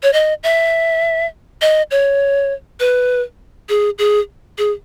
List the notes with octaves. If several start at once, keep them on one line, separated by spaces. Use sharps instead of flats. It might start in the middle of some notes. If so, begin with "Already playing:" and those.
C#5
D#5
E5
D#5
C#5
B4
G#4
G#4
G#4